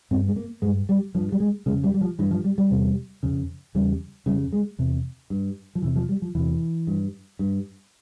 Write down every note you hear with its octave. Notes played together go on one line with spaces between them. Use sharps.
G2 C4
G#3
A#3
G2 G#3
G3
G2 F3
G3
G#3
F2 C#3 G#3
G3
G3
F3
G2 E3
F3
G3
G3
E2 C3
F2 C#3
E2 C#3 G3
F2 C#3 G3
G#3
E2 C3
G2
F3
E2 C3 E3
F3
G3
F3
E2 C3 E3
G2
G2